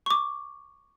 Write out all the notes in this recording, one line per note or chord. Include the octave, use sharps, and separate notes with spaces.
C#6 D6